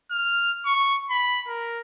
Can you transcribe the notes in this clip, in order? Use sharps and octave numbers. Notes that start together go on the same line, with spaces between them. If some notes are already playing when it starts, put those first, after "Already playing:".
F6
C#6
B5
A#4